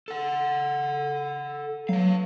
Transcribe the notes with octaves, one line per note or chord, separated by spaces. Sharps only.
A4 F#5
F#3 B4 F5